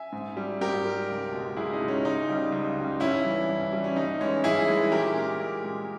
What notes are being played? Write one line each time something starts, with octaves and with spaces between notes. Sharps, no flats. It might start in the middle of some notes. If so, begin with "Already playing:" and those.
Already playing: E5 G#5
G#2
G3
G#2 G4 A#4
G3
C#2
B2 G#3
C#2 E4 G#4
D#4
B2 G#3
C#4
C#2 D#4
C#3 G3
C#2
C#3 G3
G2 C#4 E4
E3 G3
G2
E3 G3
C#4
G2 D#4
E3 G#3 C#4
G2 E4 G#4
E3 G#3
A#2 G4 A#4
G#3
A#2
G#3